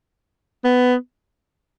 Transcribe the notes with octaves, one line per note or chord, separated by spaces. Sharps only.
B3